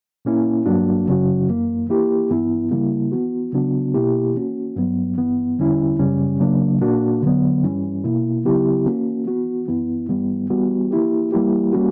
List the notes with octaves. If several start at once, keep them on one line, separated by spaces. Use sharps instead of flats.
A#2 A#3 C#4 E4
G2 F#3 A#3 D4 F#4
F#2 C#3 F#3 C#4 F#4
F#2 E3 A#3
E3 A#3 E4 G4
G2 E3 B3 E4
C#3 G3 A#3 E4
E3 B3 F#4
C#3 F#3 B3 D4 F#4
B2 A#3 E4 G4
E3 A#3 C#4 F#4
G2 F#3 B3
G2 E3 B3
E2 D3 G3 C#4 E4
F#2 C#3 G3 C#4
C#3 F#3 A#3 D4
A#2 A#3 D4 F#4
D3 F#3 B3
G2 E3 G3 C#4
B2 A#3 E4
C#3 F#3 B3 E4 G4
E3 A#3 C#4 F#4
E3 B3 F#4
F#2 E3 B3 E4
G2 E3 G3 B3
E3 G3 B3 F#4
E3 A#3 E4 G4
E3 G3 A#3 E4 G4
G3 A#3 C#4 F#4